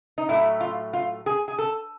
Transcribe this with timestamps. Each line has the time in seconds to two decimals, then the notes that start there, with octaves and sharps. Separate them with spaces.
0.18 D#4
0.29 A2 F#3 A3 E4
0.61 F4
0.93 F4
1.26 G#4
1.48 G#4
1.59 A4